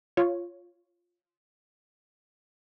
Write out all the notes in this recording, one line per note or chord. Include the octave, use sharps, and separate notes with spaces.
F4 C#5